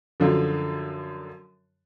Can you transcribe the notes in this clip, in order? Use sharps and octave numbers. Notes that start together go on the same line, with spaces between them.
F#2 D3 F3